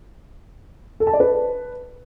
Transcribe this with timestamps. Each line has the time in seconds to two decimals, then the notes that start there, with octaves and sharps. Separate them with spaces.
1.00 A4
1.07 A5
1.13 D5
1.20 B4